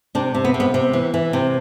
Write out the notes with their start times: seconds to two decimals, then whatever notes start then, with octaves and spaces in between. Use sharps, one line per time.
0.15 C3 D4
0.35 C3
0.45 B3
0.54 C3
0.60 B3
0.74 C3
0.93 E3
1.14 E3
1.33 C3